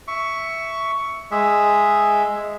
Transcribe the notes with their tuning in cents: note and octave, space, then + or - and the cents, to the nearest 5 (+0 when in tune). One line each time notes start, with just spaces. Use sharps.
E5 +0 C#6 +10
G#3 +0 E5 +0